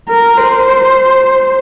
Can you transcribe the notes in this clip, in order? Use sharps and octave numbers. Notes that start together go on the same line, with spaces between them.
A#4
C5